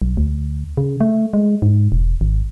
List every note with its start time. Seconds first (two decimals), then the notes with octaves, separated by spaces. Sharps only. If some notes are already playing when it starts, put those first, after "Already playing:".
0.02 B1
0.17 D2
0.77 C#3
1.01 A3
1.33 G#3
1.62 G#2
1.92 E1
2.21 G#1